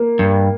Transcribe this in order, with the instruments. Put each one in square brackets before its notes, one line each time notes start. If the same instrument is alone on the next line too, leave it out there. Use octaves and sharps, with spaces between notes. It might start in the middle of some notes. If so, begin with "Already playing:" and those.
Already playing: [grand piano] A#3
[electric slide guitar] G2